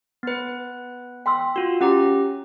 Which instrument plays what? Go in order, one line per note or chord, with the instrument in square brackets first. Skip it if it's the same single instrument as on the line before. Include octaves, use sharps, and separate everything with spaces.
[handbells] B3 B4
[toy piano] G5 C6 E6 [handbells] B6
[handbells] F4 F#4
[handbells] C#4 G4 A#5 [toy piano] F#5